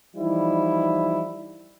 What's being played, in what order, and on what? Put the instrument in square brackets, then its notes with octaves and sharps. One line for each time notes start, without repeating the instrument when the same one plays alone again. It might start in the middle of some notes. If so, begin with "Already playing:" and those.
[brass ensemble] E3 F3 G3 D#4 E4